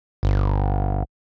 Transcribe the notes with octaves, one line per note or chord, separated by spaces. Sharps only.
G1